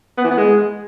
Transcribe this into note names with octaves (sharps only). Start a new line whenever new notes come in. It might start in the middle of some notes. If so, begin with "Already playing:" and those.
B3
E3
B3
G#3